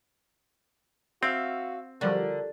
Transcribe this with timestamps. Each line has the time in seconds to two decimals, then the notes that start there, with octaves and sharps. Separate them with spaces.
1.23 C4 F#4 E5 F5
2.01 D3 F3 G3 F#4 A#4